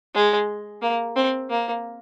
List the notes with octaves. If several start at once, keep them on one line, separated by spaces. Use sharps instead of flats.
G#3
A#3
C4
A#3